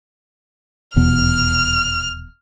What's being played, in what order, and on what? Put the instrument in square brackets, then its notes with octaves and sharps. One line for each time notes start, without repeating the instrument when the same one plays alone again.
[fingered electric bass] D#1 E2 B2 [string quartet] F6